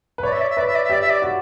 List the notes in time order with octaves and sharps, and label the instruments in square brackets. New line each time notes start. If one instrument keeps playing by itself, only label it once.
[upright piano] B4
[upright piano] C#5 [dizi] D5
[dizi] E5
D5
E5
[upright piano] B4 [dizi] D5
[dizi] E5
D5
E5
[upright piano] G4 [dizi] D5
[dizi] E5
D5
[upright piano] F#4